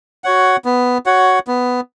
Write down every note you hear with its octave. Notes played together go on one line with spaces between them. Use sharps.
F#4 C#5 F#5
B3
F#4 C#5 F#5
B3